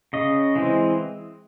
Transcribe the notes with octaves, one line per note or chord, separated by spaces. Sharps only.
C#3 D#5
E3 G#3 C4